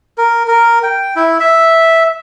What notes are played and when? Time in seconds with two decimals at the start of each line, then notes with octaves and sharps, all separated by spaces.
0.18 A#4
0.48 A#4
0.83 G5
1.16 E4
1.40 E5